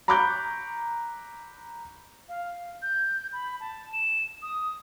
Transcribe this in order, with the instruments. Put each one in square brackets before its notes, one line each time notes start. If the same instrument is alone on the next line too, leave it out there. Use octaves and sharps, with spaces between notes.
[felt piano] A#5 B5 C#6 D6 F#6 G6
[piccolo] F5
G6
B5
A5
E7
D#6